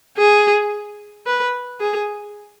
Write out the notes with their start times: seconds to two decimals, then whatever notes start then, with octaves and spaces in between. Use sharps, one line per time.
0.18 G#4
1.27 B4
1.80 G#4